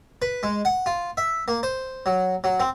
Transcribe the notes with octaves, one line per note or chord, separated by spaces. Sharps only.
B4
G#3
F#5
F4
E5
A#3
C5
F#3
F#3
C4